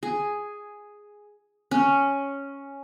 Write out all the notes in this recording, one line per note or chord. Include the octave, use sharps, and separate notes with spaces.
G#4
C#4